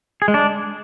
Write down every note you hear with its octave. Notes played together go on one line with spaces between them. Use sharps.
G#4
G#3
D4